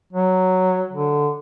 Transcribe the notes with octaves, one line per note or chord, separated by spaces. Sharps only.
F#3
D3